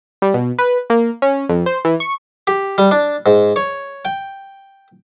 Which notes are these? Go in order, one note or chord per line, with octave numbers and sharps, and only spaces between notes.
G3
B2
B4
A#3
C#4
F2
C5
E3
C#6
G4
G3
D4
G#2
C#5
G5